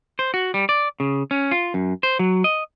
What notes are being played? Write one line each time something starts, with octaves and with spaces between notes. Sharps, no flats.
C5
F#4
G3
D5
C#3
C#4
F4
F#2
C5
F#3
D#5